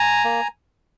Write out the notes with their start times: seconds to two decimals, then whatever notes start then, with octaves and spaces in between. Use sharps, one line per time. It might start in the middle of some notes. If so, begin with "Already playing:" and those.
Already playing: G#5 A#5
0.25 A#3